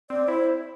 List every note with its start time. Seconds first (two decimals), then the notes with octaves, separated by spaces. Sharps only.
0.10 C4 D5
0.28 E4 C5